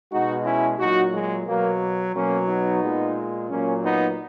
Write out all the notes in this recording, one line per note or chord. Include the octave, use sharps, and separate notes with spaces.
B2 G#3 D#4 F#4
C#4 E4
A#2 F#3 D#4 F#4
G#3
B2 F#3 A#3
B2 F#3 A#3 C#4
B3 D#4
A#2 G#3
A#2 F#3 A#3 C#4
B3 D#4